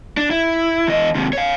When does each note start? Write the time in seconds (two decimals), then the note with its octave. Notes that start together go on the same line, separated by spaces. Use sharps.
0.17 D4
0.31 E4
0.88 E2 D#5
1.15 D#2 C3
1.33 C#5 F5